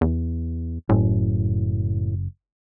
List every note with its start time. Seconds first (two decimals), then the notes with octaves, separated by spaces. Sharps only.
0.01 E2
0.89 F#1 A2